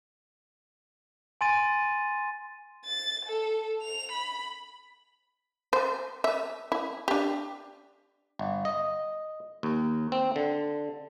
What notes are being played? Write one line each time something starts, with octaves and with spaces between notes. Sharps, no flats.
G#5 C6 A6 D#7
A6
A4
F7
B5
C5
E5
E4
D4 G4
G1
D#5
D#2
C4
D3